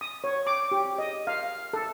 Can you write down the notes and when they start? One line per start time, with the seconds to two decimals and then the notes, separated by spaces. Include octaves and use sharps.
0.01 D#6
0.24 C#5
0.47 D6
0.71 G4
0.98 D#5
1.27 F5
1.73 A4